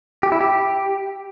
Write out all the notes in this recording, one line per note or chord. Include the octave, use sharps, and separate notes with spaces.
G4
E4
G4